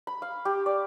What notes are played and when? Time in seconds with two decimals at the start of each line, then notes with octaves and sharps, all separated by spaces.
0.07 B5
0.22 F5
0.45 G4
0.66 D5